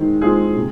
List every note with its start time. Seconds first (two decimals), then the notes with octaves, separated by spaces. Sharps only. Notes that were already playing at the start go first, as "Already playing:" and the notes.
Already playing: D#3 G#3 C4
0.22 G#3 C4 F4 G#4
0.56 C3